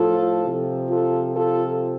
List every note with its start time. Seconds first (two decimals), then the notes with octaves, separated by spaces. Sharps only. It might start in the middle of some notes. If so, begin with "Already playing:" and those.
Already playing: A2 F3 F4 A4
0.45 C3 F3
0.88 F4 A4
1.32 F4 A4